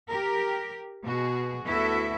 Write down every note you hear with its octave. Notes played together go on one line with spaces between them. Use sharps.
G4 A#4
B2 F#4 G#4
D2 B3 E4 F#4 A4 E5